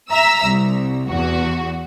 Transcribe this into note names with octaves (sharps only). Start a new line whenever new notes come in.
E5 A#5 E6
C2
E2 F#4